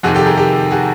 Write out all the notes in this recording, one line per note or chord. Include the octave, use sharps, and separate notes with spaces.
F2 C3 D#3 F#4 G#4
G4 A4
G#4 A#4
G4 A4
F#4 G#4